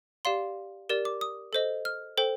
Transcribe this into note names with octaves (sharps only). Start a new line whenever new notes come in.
G4 D5 F5 C6
G4 A#4 D5
D6
D#6
A4 C5 D#5
F6
A4 C5 G5